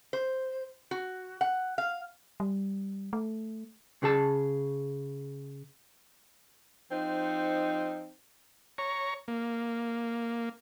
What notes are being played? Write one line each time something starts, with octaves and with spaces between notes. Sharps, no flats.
C5
F#4
F#5
F5
G3
A3
C#3 G#4 A5
F3 C4 D#4
C#5 A#5 C#6
A#3